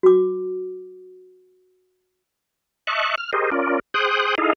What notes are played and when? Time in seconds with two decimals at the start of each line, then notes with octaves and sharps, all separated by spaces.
0.03 F#4 D6
2.87 D#5 E5 A5 C#6 F#6
3.18 F6
3.33 G4 G#4 A#4 C5 D#5
3.52 C#4 F4 A#4 D5
3.94 G#4 C5 G5 D#6 F#6
4.38 D#4 E4 G#4 A4 D#5 F5